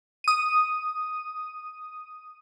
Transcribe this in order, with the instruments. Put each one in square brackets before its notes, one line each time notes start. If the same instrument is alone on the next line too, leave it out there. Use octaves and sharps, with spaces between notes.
[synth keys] D#6 D#7